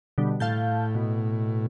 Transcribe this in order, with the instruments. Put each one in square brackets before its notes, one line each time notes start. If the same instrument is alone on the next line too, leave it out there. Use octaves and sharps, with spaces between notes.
[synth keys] B2 D3 G3
[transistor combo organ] A2 [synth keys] F5 A5 G6
[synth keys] B2